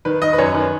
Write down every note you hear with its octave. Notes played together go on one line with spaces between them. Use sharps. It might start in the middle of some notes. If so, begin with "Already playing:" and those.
D#3 B4
D#3 D#5
B4
F#2 C#5
D#3 B4